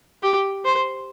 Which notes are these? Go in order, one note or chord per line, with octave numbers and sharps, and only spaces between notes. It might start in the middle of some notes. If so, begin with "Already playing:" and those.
G4
C5